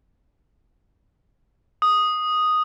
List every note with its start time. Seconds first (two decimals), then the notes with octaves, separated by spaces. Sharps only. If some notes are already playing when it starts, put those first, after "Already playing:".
1.82 D#6